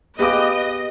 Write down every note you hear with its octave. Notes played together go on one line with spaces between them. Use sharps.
B3 G4 G#4 B4 D#5 F5 D6